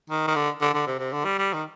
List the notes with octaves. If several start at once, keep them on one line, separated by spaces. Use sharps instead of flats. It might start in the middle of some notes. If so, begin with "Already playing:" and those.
D#3
D#3
D3
D3
D3
C3
C3
D3
G3
G3
D#3